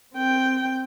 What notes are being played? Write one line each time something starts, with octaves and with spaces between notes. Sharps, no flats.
C4 G5